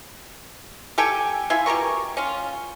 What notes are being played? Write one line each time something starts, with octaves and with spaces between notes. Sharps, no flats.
G4 A4 G5 G#5
E4 F4 E5 G#5
B2 G4 A#4 C#6
C#4 F4